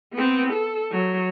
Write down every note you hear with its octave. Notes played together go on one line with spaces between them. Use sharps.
B3 C4
A4
F#3